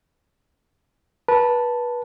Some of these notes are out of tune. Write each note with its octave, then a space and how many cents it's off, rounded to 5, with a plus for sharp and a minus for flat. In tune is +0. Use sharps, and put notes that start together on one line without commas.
B4 -25 A5 +0